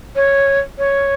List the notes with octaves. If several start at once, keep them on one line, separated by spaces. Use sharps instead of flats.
C#5
C#5